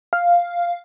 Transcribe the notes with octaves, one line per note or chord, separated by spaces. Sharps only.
F5